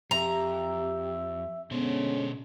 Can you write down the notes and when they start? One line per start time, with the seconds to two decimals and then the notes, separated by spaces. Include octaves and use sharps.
0.11 F2 G4 E5 A#5
1.71 B2 D3 G#3 B3 C#4 C5